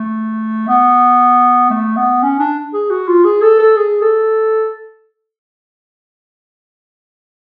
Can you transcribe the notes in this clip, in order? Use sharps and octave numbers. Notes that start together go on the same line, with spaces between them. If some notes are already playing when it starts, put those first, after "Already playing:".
Already playing: A3
B3
A3
B3
C#4
D4
G#4
F#4
F4
G#4
A4
A4
G#4
A4